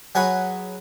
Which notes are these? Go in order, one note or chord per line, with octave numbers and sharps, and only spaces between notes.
F#3 F#4 G#4 B4 C#5 F#5